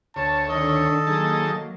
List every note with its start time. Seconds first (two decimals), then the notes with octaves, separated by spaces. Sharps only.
0.16 D2 C#5 A5
0.50 D#3 D4 A4 D#5
1.07 D#3 F#3 A#3 G#4 A5